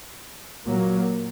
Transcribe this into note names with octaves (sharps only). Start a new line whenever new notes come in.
A#2 F#3 A#3